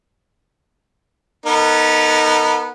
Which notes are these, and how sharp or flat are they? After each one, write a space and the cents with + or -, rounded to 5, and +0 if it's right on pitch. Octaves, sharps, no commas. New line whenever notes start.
B3 -20 D#4 +0 A#4 -40